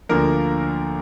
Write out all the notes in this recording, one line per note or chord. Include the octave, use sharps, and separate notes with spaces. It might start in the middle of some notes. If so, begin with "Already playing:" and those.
D2 D3 F3 A#3 A#4